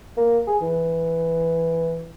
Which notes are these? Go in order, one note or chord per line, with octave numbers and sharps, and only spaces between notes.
A#3
G#4
E3